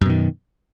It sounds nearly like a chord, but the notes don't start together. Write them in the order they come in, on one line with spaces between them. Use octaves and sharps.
F#2 B2 D#3